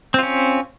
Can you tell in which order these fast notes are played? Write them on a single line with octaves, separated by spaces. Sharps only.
C4 F4 C#4